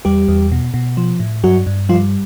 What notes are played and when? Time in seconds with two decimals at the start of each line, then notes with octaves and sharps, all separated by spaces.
0.05 E2 G3 G4
0.28 E2
0.52 B2
0.74 B2
0.97 F3
1.20 A2
1.44 G2 F#3 F#4
1.66 G2
1.89 F3 G3 F4